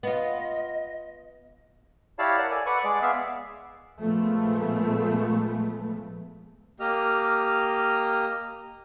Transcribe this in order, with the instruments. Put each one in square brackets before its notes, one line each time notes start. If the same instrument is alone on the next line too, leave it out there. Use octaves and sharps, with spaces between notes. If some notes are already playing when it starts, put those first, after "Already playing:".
[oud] B3 F4 [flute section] D#5
[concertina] E4 G4 C#5 D5 F5 A5
A#4 D5 F#5
A4 D5 G#5
B4 D5 F#5 C#6
G#3 G#4 D5 D6
B3 G#4 E5 F5
[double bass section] A#2 F3 G#3 A3 B3
[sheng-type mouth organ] A#3 G4 D#5 F6